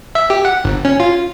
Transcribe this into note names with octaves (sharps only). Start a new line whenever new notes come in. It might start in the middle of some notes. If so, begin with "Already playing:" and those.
E5
G4
F#5
G1
C#4
F4